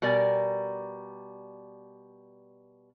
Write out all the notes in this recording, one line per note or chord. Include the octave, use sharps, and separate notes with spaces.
B2 G3 A#4 D5 G#5